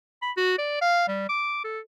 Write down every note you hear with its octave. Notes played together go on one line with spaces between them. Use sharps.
B5
F#4
D5
F5
G3
D6
A4